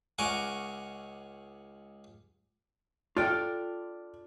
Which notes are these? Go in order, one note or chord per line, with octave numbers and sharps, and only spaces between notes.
C#2 A#4 F#5 G#5 C#6 D6
D4 F4 A4 D5 G5 F6